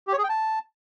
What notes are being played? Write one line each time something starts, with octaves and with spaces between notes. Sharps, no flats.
G4
C#5
G#4
G5
A5